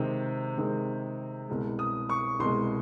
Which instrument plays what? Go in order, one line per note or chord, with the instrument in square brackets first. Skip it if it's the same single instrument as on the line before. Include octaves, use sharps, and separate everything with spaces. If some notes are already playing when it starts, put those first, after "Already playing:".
Already playing: [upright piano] C3 D#3 G#3 C4
C3 D#3 G#3 C4
C2 B2 G#3
D#6
C#6
C2 B2 G#3 C6